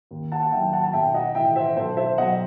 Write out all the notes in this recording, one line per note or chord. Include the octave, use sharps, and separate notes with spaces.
D#2
F#5 A5
F#5
D#3 F#3 E5 G5
F#5 A5
A5
B1 E5 G5
D#5 F#5
A2 E3 E5 G5
C5 E5
B1 A4 C5
C5 E5
B2 F#3 D#5 F#5